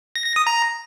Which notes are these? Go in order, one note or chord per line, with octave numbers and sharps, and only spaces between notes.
A#6
A#6
D#6
A#5